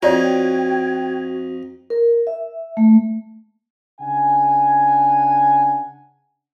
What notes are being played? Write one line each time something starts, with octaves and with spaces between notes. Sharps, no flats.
F2 D#4 F4 F#4 C#5 D5 G5 G#6
A#4
E5
A3
C#3 D4 F#5 G#5